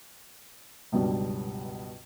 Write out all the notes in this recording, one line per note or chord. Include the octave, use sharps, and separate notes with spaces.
C#2 G2 B2 F#3 G3